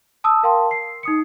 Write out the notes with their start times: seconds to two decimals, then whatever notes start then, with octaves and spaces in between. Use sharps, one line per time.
0.24 A5 D#6 E6
0.43 A#4 F5 G5 A5 C6
0.71 C7
1.03 D#4 D#6 C#7